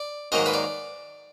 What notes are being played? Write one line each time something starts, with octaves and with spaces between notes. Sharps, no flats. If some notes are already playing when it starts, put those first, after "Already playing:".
Already playing: D5
G#2 D#3 F#3 A#3 D#5
B4
D5